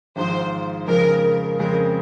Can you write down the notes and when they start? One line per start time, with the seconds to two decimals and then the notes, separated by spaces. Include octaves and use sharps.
0.16 G#1 G#2 F3 C5
0.88 F2 C#3 F3 G#3 A#4
1.59 F2 C#3 G#3 C4 A#4